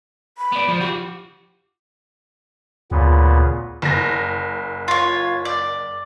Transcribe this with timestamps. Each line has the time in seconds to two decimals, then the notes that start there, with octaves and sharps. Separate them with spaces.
0.38 B5
0.52 B3 D5
0.68 F3
0.80 F4 G4 F#5
2.91 D2 A#2 C#3 B3
3.82 F#1 A#6
4.88 F4 C#5
5.45 D5